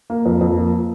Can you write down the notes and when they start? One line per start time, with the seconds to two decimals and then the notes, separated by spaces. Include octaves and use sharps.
0.10 A#3
0.26 F2
0.41 F2
0.56 A#3